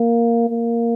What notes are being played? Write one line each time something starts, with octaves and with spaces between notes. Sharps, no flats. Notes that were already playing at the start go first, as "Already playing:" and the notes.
Already playing: A#3
A#3